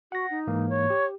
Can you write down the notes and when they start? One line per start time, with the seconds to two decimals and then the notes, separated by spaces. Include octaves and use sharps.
0.12 F#4 F#5 A#6
0.30 D#4
0.47 G#2 E3 A#3
0.69 C#5
0.90 G4